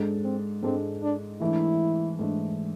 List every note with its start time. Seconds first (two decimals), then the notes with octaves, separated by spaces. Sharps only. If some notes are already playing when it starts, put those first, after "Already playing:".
Already playing: G#2 G#3 D4 A4
0.24 C4
0.63 G#2 G#3 C4 D4 A4
1.02 D4
1.40 G#2 E3 A3 D4 E4
2.19 G#2 E3 A3 D4